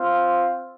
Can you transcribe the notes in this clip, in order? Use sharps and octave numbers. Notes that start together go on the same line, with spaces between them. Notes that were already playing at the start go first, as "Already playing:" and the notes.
Already playing: C4 F4